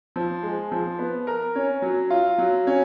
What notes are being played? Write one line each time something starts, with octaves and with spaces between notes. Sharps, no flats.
F3
G#3
F3
B3
A#4
C#4
F#3
F4
F#3
C#4